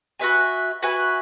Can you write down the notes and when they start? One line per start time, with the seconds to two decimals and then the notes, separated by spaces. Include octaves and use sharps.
0.19 F#4 B4 E5 G#5
0.83 F#4 B4 E5 G#5